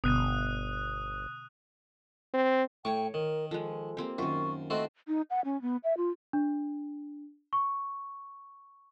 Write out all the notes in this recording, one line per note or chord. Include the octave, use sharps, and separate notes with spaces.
G1 B2 D3 B3 D#6 F#6 D#7
C4
A2 C#5 G5 C#6 D6
D#3 A#4
F3 G#3 A4
A#3 C4 G4
F#2 D#3 F4 C#6
A3 C4 F#4 C5 D#5
D#4
F#5
C#4
B3
E5
F4
D4
C#6